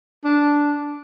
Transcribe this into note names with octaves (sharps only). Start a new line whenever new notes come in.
D4